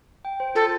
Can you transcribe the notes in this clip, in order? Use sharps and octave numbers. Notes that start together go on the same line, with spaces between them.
G5
C5
F4 A4